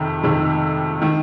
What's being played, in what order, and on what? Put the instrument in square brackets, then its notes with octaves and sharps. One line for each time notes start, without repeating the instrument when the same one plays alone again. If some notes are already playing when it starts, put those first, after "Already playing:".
Already playing: [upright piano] F2 C3 D#3
F2 C3 D#3
D#3